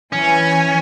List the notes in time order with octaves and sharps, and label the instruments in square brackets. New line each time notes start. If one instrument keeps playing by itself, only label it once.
[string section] E3 G#5 [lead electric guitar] C#4